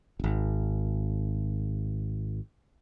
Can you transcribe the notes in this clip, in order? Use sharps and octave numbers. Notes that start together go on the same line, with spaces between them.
D#1 G#1